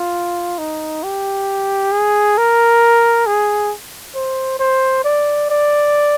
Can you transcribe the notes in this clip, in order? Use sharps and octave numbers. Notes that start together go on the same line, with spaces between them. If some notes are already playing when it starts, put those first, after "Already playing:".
Already playing: F4
D#4
G4
G#4
A#4
G#4
C5
C5
D5
D5